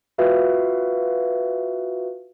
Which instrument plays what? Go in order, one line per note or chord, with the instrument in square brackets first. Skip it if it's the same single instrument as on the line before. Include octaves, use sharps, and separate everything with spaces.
[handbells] F4 F#4 B4 E5 F5